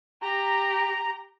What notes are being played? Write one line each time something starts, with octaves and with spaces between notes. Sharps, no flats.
G4 A#5